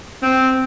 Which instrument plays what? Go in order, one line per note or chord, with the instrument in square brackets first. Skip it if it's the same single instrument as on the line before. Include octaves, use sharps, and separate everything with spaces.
[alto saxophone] C4